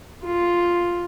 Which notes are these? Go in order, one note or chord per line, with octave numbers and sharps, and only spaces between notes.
F4